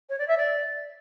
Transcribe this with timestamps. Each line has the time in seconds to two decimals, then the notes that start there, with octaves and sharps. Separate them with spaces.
0.09 C#5
0.19 D5
0.28 E5
0.37 D5